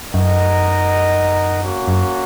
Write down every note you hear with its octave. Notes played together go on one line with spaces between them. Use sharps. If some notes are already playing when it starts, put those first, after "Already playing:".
F#2 D#4 A#4 D#5 F#5
A#3 C#4 F#4
F#2